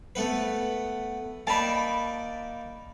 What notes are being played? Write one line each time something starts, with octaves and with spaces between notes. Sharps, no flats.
A3 B3 B4
A#3 D#4 D5 A5 B5